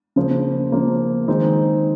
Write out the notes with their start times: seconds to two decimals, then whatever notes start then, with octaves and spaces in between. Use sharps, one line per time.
0.16 C#3 F3 A#3
0.72 C#3 F3 A#3
1.28 D#3 G#3 C4 D#4